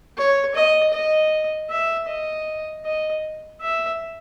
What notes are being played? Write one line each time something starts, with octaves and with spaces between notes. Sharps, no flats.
C#5
D#5
D#5
E5
D#5
D#5
E5